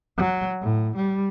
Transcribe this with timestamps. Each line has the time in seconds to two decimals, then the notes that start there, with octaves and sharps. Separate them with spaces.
0.17 F#3
0.62 A2
0.96 G3